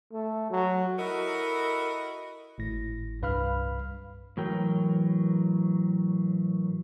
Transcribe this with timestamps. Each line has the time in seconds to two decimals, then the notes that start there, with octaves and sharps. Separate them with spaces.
0.13 A3
0.51 F#3
0.98 E4 F#4 A4 A#4 D#5
2.58 G#1 A2 A#6
3.22 C2 G2 B4 F5 B5 F6
4.37 A2 E3 F#3 A#4 G5